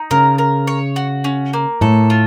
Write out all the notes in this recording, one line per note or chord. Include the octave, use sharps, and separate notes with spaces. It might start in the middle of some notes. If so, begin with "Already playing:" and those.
Already playing: D#4
C#3 A#4
A#4
C#5
F#4
C#4
A#3
A2 A4
F4